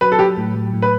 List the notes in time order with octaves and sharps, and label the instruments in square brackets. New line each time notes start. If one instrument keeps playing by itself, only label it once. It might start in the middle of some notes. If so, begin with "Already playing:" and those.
[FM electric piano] F#3 [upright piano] B4
[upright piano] A4
[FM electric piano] F#3 [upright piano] G4
[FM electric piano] A2
F#3
A2
[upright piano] B4